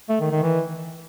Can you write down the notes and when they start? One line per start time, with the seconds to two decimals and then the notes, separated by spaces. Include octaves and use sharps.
0.09 A3
0.20 D#3
0.32 D#3
0.43 E3